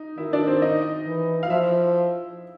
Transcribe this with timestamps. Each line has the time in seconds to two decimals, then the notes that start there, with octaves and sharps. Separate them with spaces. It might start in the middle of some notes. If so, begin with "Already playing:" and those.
Already playing: D#4
0.18 D#3 E4 E5
0.33 D4 D5
0.47 C4 C5
0.62 D#4 D#5
1.06 E3
1.43 F5
1.50 F3 E4 E5